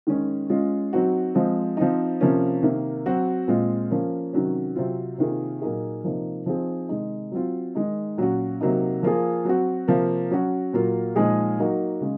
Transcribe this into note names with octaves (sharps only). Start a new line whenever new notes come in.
D#3 G#3 C#4
G#3 C#4 F4
F#3 C4 D#4 F#4
F3 G#3 C4
F3 C4 D#4
C3 F3 A#3 C#4
C3 D#3 A#3
F#3 C4 F#4
A#2 G#3 C4 F4
F3 A#3 C#4
C3 D#3 F#3 C#4
C3 F#3 C4 F4
C3 D#3 A#3 F4 G#4
A#2 F#3 A#3 D#4 G#4
C3 F3 A#3 D#4
F3 C4 D#4 G#4
C3 D#3 G#3 D#4
F#3 C4 F4
D#3 G#3 D#4
A#2 F#3 C#4 F#4
C3 F#3 A#3 D#4
F3 A#3 F4 G#4
F#3 C4 F#4
C3 F3 A#3
F#3 C#4 F#4
A#2 F#3 A#3 F4
A#2 F3 G#3 D#4 G#4
F#3 A#3 D#4 F#4
C#3 G#3